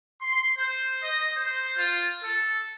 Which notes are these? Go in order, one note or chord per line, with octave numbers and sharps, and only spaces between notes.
C6
C5
D#5
C5
F4
A4